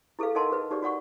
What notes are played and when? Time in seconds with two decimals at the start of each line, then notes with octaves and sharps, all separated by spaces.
0.19 E4 G#4 A4 B4 F5
0.35 D#4 A#4 D#5 F#5 A5 C6
0.51 G#4 B4 D#5
0.71 D#4 G4 G#4 D5
0.83 F#4 D5 F#5 C#6